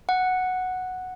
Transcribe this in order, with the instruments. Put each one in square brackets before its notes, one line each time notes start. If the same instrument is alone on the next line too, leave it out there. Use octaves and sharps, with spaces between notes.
[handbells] F#5